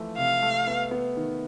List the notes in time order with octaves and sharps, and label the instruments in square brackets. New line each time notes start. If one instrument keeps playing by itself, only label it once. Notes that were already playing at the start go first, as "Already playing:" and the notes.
Already playing: [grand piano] E3 F3 A3
[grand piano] C3 [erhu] F5
[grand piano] A3
B3
B3
D#3